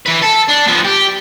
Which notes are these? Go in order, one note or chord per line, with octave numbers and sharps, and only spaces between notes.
E3 B4
A4
D4
F3 B3
G4